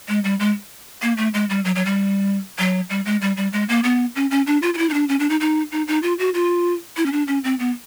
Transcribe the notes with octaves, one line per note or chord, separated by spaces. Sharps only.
G#3
G3
G#3
A#3
A3
G#3
G3
F#3
F#3
G3
F#3
G3
G#3
G3
G3
G#3
A#3
B3
C#4
C#4
D4
F4
F4
E4
D#4
D4
C#4
D4
D#4
D#4
D#4
D#4
F4
F#4
F4
E4
C#4
D4
C#4
C4
B3